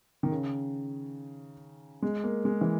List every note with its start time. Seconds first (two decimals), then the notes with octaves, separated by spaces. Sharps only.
0.23 D#3
0.31 C#3
2.02 G#3
2.24 A#3
2.45 G#3
2.61 E3